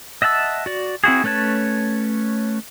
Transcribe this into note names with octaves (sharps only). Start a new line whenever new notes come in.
D#5 E5 F#5 A5 E6
F#4 D5
C4 E4 F#4 G#4
A3 C#4 B4 C#5 A5